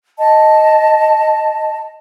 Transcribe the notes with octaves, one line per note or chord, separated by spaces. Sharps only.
D#5 A5